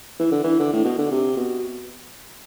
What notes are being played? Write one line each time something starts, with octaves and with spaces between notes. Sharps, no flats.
E3
D3
E3
D3
A2
B2
D3
C3
B2